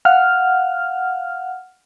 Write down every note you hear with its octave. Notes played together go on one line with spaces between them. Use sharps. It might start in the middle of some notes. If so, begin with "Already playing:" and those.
F5 F#5 F6